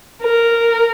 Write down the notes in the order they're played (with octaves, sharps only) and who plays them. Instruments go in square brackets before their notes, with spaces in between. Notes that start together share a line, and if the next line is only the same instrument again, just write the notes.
[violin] A#4